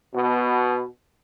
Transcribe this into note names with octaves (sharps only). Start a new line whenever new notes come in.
B2